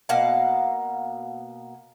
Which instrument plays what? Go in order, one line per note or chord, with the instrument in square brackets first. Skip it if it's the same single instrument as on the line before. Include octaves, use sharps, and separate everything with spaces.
[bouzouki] B2 A#3 F5 F#5